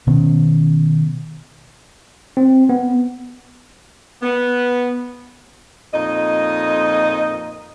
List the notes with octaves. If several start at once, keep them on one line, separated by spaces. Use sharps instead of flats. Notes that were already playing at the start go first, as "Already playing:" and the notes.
B2 D#3 B3 C#4
C4
B3
B3
F2 A#2 D#4 D#5